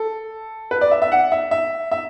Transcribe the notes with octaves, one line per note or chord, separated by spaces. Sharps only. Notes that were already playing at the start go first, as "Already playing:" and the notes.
Already playing: A4
B4
D5
E5
E5
F#5
E5
E5
E5